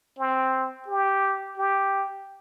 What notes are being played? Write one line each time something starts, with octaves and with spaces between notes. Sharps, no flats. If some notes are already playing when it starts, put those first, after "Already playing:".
C4
G4
G4